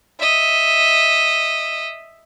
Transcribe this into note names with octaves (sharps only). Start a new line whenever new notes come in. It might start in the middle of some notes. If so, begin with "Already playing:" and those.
D#5 E5